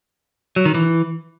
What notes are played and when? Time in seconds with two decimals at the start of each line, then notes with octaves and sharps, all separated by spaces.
0.56 F#3
0.65 D#3
0.75 E3